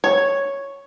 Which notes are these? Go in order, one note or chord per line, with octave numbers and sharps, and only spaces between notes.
C#5